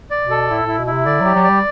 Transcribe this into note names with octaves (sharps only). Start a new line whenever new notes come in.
D5
B2
A4
A2 E4
A2 E4
B2
E4
C3
D3 D5
F#3 G4
F#3
G3 D5